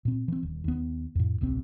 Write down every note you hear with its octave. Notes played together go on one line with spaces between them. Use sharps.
A#2 C4
E3 C4
D#1
D#2 B3
F2 A2
D1 A#1 C3 C4